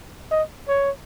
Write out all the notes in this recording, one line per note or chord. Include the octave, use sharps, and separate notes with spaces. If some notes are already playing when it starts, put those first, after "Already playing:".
D#5
C#5